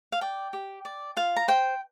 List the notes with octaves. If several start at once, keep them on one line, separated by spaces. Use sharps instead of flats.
F5
D5 G5
G4
D5
F4 F5
A#5
C5 G5